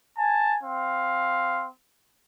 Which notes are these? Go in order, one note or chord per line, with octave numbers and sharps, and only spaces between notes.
G#5 A5
C4 F5